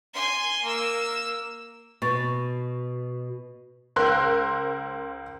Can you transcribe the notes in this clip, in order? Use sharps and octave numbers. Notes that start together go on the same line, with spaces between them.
G#5 C6
A#3 E6
B2 B4 C#6 A6
C#2 A#4 C5 C6 E6 F#6